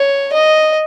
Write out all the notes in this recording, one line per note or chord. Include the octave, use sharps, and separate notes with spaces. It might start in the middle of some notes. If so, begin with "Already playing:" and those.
Already playing: C#5
D#5